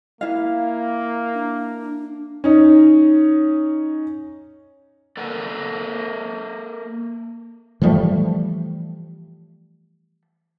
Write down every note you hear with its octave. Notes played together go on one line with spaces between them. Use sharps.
A#3 E4 F5
D4
C#4 D#4
A#3 A4 A#4 F#5
E3 F3 G3 A3